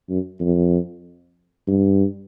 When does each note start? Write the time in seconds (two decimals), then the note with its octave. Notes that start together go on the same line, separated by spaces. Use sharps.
0.09 F#2
0.40 F2
1.67 G2